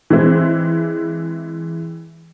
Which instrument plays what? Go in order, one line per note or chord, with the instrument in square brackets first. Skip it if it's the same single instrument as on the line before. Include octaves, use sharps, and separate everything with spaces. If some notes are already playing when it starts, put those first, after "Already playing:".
[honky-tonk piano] E3 G#3 C4 E4